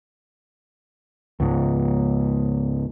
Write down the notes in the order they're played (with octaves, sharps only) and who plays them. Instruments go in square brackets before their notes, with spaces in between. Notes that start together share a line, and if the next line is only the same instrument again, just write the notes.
[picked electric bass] C#2 G#2